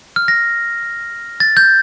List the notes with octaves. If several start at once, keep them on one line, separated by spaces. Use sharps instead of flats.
F6
A#6
A6
G6